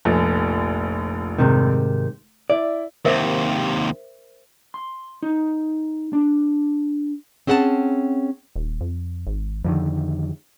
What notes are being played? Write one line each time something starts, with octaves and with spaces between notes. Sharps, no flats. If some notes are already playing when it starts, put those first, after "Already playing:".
F1 A#1
G#2 C3 D#3
E4 D5
D#2 C3 A#4 C5 E5
C6
D#4
D4
C4 C#4 G#4 F#5 G5 A5
D#1
F2
G#1
F2 D3 D#3 F3